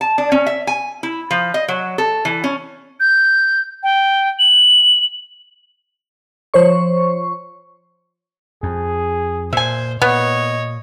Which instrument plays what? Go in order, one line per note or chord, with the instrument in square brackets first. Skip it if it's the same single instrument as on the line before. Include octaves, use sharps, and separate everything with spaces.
[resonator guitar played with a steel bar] A5
D4
C#4
E5
G#5
E4
F3
D#5
F#3
A4
E3
C#4
[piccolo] G6
G5
F#7
[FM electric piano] F3 C5 C#5 C#6
[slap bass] F2 [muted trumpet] G#4
[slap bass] A#2 [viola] C5 [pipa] E5 G#5
[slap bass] A#2 [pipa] B3 [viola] C#5 [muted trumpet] D#5